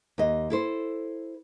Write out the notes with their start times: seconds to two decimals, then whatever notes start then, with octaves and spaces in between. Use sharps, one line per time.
0.18 D#2 D#5
0.50 E4 A4 C5